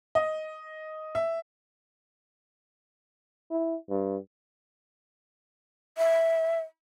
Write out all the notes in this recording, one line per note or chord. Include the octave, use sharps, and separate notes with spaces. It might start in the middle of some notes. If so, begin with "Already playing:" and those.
D#5
E5
E4
G2
E5